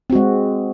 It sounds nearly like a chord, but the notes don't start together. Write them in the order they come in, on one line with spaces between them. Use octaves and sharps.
C4 F#4 G#3